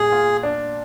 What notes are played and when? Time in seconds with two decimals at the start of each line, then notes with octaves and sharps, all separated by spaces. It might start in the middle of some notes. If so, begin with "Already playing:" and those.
Already playing: A#2 G3 G#4
0.12 F4
0.43 D4